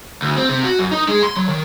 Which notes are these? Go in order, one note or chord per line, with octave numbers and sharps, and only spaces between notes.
D2
C4
C3
F#4
F#2
D#4
G#3
C6
F#3
D#3